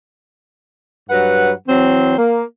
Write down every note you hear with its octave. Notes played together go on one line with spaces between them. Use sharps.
G2 F#3 B4 F#5
E3 F#3 C4
A#3